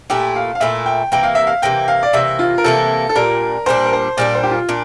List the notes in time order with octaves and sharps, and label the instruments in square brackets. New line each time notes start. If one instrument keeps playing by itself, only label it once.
[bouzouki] A#2 A3 E4 [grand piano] G4
[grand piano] F5
F5
[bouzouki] A#2 A3 E4 [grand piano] E5
[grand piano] G5
[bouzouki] C3 E3 A#3 [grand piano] G5
[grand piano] F5
E5
F5
[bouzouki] C3 E3 A#3 [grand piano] G5
[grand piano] F5
D5
[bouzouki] C3 E3 A#3 [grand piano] E5
[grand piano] F4
A#4
[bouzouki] C3 E3 A#3 [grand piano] A4
[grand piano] A4
[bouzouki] A#2 G3 D4 [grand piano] A#4
[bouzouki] A#2 G3 D4 [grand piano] C5
[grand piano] A#4
C5
[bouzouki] A#2 G3 D4 [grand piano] D5
[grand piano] C5
G4
F4
[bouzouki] A#2 D4